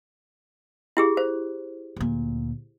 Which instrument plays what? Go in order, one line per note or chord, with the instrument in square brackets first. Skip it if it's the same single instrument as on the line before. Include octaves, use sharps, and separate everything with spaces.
[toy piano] E4 G4 G#4
C5
[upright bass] D2 A#2